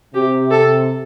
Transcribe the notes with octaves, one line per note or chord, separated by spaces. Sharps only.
C3 G4
A4